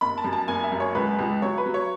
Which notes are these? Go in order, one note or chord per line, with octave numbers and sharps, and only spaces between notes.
F#1 B5
A5
F#2
A5
F#1 G#5
E5
F#2
C#5
C#2 B4
C#2
F#3 C#5
B4
F#3
C#5